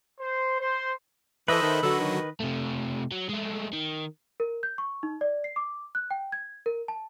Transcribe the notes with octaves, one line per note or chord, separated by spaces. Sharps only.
C5
C5
E3 A4 B4 C5 D#5 E5
D#3
D3 F#3 F#4 A4
D#3
C3 A3
F#3
G#3 A3
D#3
A#4
G6
C#6
D#4
D5
C7
D6
F#6
G5
G#6
A#4
A5